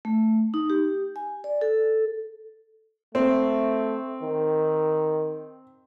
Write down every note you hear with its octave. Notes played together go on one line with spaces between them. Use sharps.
A3
D#4
G4
G#5
D5
A4
A3 C4
D#3